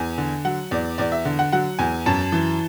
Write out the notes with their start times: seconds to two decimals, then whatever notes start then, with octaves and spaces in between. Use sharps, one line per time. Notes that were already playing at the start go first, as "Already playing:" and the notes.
Already playing: E2 G#5
0.18 D3
0.45 F#3 F#5
0.71 E2 D5
0.98 E2 D5
1.12 E5
1.25 D3
1.39 F#5
1.52 F#3 F#5
1.79 E2 G#5
2.06 F#2 A5
2.32 E3